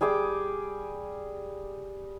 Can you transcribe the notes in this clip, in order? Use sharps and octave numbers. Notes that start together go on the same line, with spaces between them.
G3 G#4 G5 D6